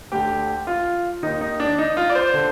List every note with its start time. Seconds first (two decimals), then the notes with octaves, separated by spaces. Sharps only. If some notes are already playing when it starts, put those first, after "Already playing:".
0.12 D2 D3 G4
0.67 F4
1.23 D#2 D#3 D#4
1.41 D#4
1.60 D4
1.79 D#4
1.97 F4
2.10 D5
2.15 C5
2.34 D3